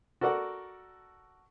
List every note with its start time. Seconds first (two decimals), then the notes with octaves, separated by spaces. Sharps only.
0.21 F#4 A4 A#4 D5 F#5